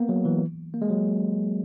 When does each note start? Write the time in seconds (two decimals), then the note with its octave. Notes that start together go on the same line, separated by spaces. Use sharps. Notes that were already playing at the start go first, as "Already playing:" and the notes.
Already playing: A#3 B3
0.09 F#3
0.25 E3
0.74 A#3
0.82 G#3
0.90 F#3